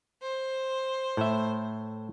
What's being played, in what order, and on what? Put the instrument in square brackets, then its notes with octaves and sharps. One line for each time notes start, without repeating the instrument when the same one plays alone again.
[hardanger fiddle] C5
[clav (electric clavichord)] A2 E5